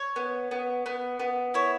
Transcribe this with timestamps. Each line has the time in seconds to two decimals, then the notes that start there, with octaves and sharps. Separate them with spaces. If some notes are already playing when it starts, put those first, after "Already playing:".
Already playing: C#5
0.16 B3
0.51 B3
0.86 B3
1.19 B3
1.54 E4 C#5